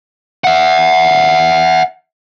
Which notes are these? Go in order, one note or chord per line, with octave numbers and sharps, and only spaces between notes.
E5 F#5